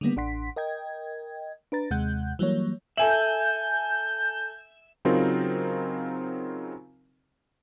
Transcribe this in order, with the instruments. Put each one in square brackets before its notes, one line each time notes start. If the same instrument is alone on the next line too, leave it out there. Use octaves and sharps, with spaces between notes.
[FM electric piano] D3 D#3 G3 A#3 B3
A1 D4 F#5 C6 B6
A#4 D#5 G5 G#6
D4 B4 A#5 A6
D#2 C3 G#3 F#5 F#6 G6
E3 F#3 G3 A#3 C#5
[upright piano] A4 G#5 F#7 [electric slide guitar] E5 [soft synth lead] G6
[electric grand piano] C#3 F#3 C4 D#4 F4 A#4